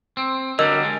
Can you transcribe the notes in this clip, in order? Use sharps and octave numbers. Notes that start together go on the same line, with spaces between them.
C4
D3 F#3 G3 A#4 D#5 E6
G#3